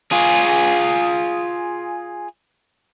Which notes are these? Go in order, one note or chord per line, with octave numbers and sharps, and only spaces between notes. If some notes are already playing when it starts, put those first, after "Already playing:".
F4 G#4